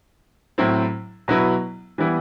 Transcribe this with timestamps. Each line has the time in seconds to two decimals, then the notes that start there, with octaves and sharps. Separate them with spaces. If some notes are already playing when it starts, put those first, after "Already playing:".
0.58 A2 F#3 C4 E4
1.28 B2 F#3 B3 E4
1.98 E3 G3 B3 E4